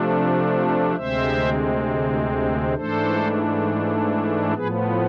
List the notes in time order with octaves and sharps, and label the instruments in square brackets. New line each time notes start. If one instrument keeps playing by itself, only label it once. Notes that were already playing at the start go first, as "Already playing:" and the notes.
Already playing: [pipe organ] C3 F3 A3 D4
D2 C3 G#3 C4 C5 E5
G#2 E3 A3 D4 A4 C5
A2 F3 B3 G#4 B4